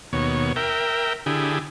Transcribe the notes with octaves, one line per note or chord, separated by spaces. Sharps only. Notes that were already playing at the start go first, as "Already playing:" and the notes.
D#2 B2 C#5
A#4 E5 G5
D3 E4 G4 G#4